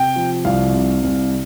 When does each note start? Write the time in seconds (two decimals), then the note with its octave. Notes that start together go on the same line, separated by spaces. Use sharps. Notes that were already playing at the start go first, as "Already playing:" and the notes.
Already playing: C3 G5
0.16 F3
0.45 C2 F5
0.75 C3
1.04 C2